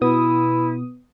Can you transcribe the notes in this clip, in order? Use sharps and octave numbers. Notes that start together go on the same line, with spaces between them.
B2 B3 E4 D#6